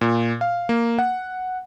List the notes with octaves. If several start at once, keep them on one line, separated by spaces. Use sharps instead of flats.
A#2
F5
A#3
F#5